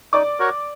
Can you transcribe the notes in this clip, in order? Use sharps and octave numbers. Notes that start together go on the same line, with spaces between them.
D#4 D5 D6
F#4 A#4 C#5